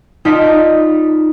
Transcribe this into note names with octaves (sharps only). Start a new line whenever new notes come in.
D#4 F4 D5 A5 B6